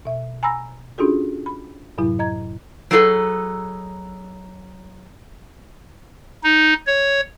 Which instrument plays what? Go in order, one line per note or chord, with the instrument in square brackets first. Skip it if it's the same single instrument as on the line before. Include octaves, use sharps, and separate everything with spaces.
[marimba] B2 E5
G#5 A#5 B5 E6 A#6
C#4 D4 F4 F#4 G#4 A4
B5
F#2 A2 C3 F#3 E4
D#5 A#5 G#6
[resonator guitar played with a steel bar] F#3 D#4 G#4 A4 B4
[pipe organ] D#4
C#5